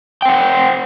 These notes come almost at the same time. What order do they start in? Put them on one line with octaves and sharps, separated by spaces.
G5 C5 F#5